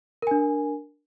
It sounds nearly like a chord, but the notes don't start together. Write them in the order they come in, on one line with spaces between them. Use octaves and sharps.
A#4 G#5 D4